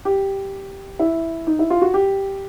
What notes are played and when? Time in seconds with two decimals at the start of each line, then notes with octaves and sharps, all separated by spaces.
0.05 G4
0.99 E4
1.47 D#4
1.59 E4
1.70 F4
1.82 F#4
1.94 G4